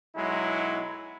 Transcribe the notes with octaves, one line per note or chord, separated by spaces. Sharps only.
B1 F#3 G#3 E4